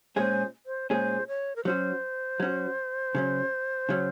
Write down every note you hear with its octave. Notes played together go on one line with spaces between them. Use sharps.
A#2 G#3 C#4 G#4 C5
C5
A#2 G#3 C#4 G#4 C5
C#5
A#4
F#3 C#4 F#4 C5
F#3 C#4 F#4
C#3 F#3 C#4
C#3 F#3 C#4